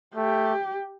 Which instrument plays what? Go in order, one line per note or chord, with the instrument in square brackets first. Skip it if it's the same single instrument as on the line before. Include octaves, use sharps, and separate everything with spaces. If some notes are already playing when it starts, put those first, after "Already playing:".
[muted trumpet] A3 [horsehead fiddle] G4